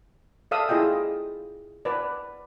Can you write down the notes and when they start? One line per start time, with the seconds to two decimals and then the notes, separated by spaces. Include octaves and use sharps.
0.51 A4 D5 E5 F5 D#6 E6
0.69 E4 F4 G#4 D#5 G5
1.85 B4 D5